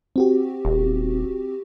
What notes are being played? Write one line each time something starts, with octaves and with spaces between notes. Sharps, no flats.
C4 F#4 G4
D#1